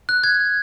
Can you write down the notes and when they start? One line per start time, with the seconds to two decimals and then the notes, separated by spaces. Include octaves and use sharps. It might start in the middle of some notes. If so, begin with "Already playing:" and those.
0.09 F#6
0.24 G#6